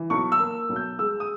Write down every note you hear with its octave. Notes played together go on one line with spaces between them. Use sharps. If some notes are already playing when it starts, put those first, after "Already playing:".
Already playing: E3
B1 C#6
E6
A#3
B1
G6
G#3 E6
D#6